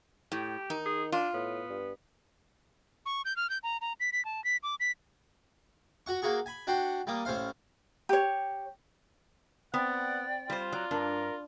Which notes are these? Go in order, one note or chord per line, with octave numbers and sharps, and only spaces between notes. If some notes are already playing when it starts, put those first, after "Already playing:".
A2 G4
D#3 D#4
G#4
D4 F4
A2 B3
G2
C#6
G6
F6
G6
A#5
A#5
B6
B6
A5
B6
D6
B6
F#4 F#5 C#6
A#3 F#4 G#4 C#6
G#5 B5
D4 F#4 F#5 G5 C6
G3 A#3 D#6
A1 C#4 C5 F5
G4 C#5
B3 C4 D5 F#5 G5
G3 F4 C5
F#3 D5 A#5
G2 D4 A#4